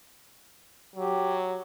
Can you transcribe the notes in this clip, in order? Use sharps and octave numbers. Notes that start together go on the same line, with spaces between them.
F#3 G4